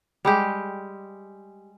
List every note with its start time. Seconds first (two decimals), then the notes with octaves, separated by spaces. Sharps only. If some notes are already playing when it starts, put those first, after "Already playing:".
0.25 G3 G#3 G4